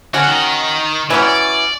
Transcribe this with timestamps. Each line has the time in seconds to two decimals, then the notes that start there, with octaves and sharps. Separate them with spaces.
0.14 D3 C#4 F#4
0.28 D#3
1.10 A2 E3 F#3 C#4 G4
1.23 D5